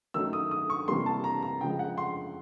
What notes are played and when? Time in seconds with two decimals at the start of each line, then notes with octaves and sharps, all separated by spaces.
0.14 D#3 F#3 A3 C#4 E6
0.33 D#6
0.51 D#6
0.70 C#6
0.88 C3 E3 G3 A#3 C6
1.06 A5
1.24 A#5
1.42 A#5
1.61 C#3 F3 G#3 G5
1.79 F#5
1.98 C6